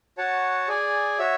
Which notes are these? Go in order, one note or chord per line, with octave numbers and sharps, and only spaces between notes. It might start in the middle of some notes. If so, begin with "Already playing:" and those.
F#4 C#5 F#5 A5
G#4 D5 G#5
F#4 C#5 E5